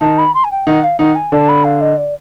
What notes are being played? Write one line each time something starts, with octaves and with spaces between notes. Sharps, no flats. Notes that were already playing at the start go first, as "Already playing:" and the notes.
D#3 D#4 A5
B5
C6
G#5
G5
D#3 D#4 F#5
F5
D#3 D#4 F#5
G#5
D3 D4 A5
B5
F5
D#5
D5